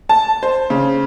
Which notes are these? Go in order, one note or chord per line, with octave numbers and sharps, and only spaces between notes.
A5
C5
C#3